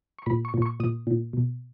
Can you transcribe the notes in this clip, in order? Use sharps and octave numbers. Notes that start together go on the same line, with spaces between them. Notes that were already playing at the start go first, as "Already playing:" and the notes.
C#6
A#2 B5
C#6
A#2
C#6
A#2 D#6
A#2
B2